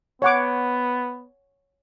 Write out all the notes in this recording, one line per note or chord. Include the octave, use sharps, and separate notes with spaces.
B3 C#5 F#5 D6